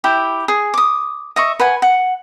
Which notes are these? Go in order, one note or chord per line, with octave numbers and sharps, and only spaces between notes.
E4 G4 G5
G#4
D6 D#6
D#5 E5 C#6
B4 F#5 G#5
F#5